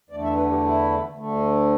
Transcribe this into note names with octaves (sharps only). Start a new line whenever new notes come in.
E2 D3 A3 D5
E5
B4
G4
E4
D2 D3 A3